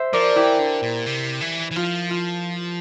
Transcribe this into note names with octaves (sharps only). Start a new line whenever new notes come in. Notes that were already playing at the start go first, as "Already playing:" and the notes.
Already playing: C5 E5
F3 A#4 D5
E3 E4 G4
D3
A#2
C3
E3
E3
F3 F4
F4